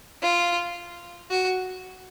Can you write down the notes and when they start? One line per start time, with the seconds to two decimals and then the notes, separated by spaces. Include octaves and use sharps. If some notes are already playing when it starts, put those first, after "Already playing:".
0.22 F4
1.30 F#4